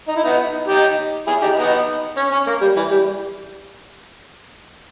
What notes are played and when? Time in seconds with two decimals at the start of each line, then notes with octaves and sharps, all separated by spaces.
0.08 D#4
0.16 E4
0.24 B3 D#4
0.68 D#4 G4
1.27 E4 G#4
1.42 D#4 G4
1.57 B3 D#4
2.17 C#4
2.32 C#4
2.47 A#3
2.61 G3
2.76 E3
2.91 G3